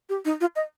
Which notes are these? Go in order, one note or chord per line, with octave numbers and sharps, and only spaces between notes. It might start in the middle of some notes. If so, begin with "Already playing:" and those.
G4
D#4
F4
D#5